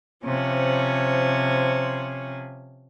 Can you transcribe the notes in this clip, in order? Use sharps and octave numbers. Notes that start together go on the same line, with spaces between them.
C3 F3 C#4